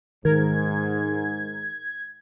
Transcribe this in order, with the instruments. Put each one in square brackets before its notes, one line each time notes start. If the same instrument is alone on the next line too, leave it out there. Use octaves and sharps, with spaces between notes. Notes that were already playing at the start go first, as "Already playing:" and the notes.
[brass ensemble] G#2 [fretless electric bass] D#3 [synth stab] A#4 [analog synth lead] G#6